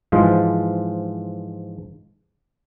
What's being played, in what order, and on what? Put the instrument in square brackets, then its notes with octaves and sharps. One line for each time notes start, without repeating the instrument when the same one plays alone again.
[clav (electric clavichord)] G#2 E3 F3 G#3 F4